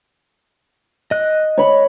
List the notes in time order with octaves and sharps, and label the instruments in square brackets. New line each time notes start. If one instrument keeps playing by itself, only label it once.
[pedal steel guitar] D#5 F#6
[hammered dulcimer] C#5 B5